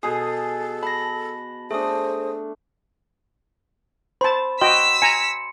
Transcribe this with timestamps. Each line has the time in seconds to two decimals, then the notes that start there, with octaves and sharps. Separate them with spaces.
0.03 B2 G#4 A4 D#6
0.83 A5 B5 A#6
1.71 A3 D4 G#4 C5 D#6
4.21 C5 A5 B5
4.61 F#4 D#5 G5 C6 E6 B6
5.02 G#5 A#5 C#7